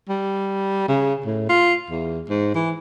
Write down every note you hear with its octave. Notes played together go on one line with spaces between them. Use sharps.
G3
C#3
A2
F4
E2
G#2
E3